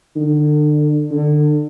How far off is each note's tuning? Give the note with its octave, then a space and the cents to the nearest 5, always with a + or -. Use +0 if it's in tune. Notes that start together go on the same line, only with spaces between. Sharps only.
D3 +30
D3 +30